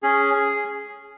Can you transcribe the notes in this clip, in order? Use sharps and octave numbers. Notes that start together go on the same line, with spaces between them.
C#4 G#4
G#4